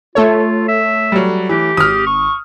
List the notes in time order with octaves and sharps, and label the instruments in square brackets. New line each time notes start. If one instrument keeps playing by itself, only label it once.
[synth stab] A3 A4 C#5 [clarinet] F4
[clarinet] E5
[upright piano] F#3 G3
[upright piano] E3 [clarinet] G4
[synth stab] G#1 [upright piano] D#6 F6
[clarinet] C#6